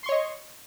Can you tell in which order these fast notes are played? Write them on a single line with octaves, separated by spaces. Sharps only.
C6 C#6 C#5 D#5